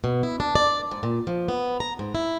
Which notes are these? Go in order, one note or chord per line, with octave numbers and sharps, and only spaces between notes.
B2
E4
D4
D5
G#2
A#2
F3
B3
A#5
G#2
E4